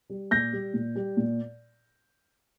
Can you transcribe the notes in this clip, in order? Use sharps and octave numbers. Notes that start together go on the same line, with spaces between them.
G3
A#2 G6 A#6
G3
A#2
G3
A#2